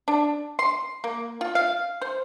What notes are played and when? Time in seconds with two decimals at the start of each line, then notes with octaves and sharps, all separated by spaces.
0.08 D4
0.59 C6
1.04 A#3
1.41 F4
1.55 F5
2.01 C5